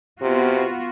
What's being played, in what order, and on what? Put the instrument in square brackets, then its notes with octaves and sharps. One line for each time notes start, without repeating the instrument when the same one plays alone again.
[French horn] C3 [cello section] B3 F4 F#4